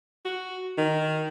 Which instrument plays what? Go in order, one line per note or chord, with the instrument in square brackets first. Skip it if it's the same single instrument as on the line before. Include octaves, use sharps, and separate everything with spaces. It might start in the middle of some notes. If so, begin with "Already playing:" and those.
[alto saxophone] F#4
D#3